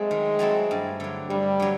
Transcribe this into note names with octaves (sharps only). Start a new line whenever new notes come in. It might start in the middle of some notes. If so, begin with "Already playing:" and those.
Already playing: F#3 G#3 A3 C4
D#3
F#3 A3 C4 E4
G2
D3 F#3
G2 G3
D3 F#3